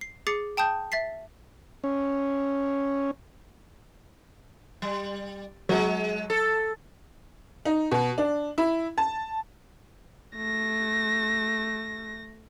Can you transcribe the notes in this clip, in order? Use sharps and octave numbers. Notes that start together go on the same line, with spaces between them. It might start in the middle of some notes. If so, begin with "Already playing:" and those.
C7
G#4 D6 A6 C7 C#7
G5 A5 D#6 G6
E5 A6 B6 C7
C#4
G3
F#3 G#3
A4
D#4
B2
D4
E4
A5
A3 A#6